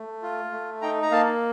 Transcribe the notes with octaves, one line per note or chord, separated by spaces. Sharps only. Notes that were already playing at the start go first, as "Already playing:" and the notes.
Already playing: A3
F4
A3
D#4 G5 A#5
A#5
A#3 F5 A5